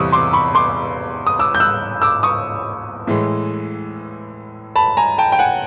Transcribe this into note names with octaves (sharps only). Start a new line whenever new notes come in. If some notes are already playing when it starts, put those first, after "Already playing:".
Already playing: E2 C3 E3 G3 C#6 D#6 E6
C6 D6
B5 C#6
C6 D6
D#6
D6 E6
G6
E6 F#6
D6 E6
C#6 D#6
A2 E3 G#3
A5 B5
G#5 A#5
G5 A5
G5
F#5 G#5